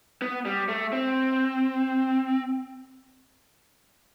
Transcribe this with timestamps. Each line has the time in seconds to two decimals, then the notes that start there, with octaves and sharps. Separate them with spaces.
0.22 B3
0.45 G3
0.69 A3
0.92 C4